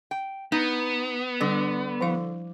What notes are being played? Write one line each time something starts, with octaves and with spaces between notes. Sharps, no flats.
G5
B3 D#4
D3 G3
F3 E4 F5